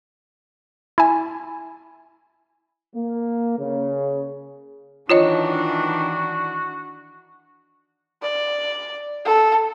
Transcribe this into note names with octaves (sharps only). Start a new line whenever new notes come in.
E4 G#5
A#3
C#3
D#3 E3 D4 F4 F#4 C#5 D#5
D5
A4